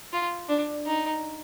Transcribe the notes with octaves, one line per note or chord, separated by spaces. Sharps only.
F4
D4
D#4